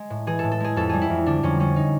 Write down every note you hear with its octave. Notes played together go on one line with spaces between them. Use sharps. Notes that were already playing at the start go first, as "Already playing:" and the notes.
Already playing: G#3
A2
E3 G#4
A2 A4
A4
G#3 G#4
F2 A4
G3 G#4
E4
F2
D3 D4
F2 C#4
G3 C#4
D#4